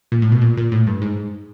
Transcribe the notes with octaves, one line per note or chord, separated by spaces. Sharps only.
A#2
A2
B2
A#2
A#2
A2
G2
G#2